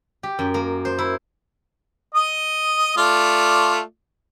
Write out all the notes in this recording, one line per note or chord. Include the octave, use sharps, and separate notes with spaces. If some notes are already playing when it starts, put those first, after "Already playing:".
G4
F#2
A#3
C5
E4
D#5 D#6
A3 F4 D5